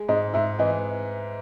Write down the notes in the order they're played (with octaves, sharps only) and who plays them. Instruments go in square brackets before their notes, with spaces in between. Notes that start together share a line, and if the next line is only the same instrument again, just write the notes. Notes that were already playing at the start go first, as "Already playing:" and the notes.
Already playing: [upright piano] G#3
[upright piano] G#2 [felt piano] D#5
[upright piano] G#2 [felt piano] E5
[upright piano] E3 [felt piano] D#5